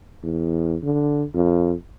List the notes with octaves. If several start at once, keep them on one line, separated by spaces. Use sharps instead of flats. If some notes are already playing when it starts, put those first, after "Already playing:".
E2
D3
F2